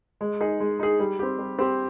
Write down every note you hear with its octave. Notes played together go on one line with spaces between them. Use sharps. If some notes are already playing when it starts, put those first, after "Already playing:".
G#3
D#4 G#4
G#3
D#4 G#4
G3
C4 G4
G3
C4 G4